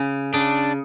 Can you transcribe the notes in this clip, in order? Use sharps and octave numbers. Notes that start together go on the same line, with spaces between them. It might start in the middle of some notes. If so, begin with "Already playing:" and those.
Already playing: C#3
C#3 D4